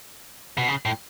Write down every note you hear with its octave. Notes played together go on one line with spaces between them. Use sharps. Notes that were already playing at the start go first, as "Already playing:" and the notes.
B2
C#3
A2